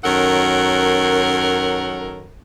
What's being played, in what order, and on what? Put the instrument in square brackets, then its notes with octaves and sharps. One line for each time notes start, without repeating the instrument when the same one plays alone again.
[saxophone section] F#2 D#3 A4 A#4 C#5 F#5